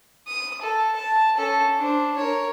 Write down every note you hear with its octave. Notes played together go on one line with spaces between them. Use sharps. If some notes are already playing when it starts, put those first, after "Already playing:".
D#6
A4
A5
C#4 A4
D4 C5
A#4 C#5